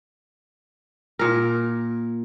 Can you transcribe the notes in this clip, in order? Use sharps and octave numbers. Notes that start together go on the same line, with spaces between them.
A#2 A#4